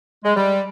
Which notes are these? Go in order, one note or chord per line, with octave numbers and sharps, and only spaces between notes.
G#3
G3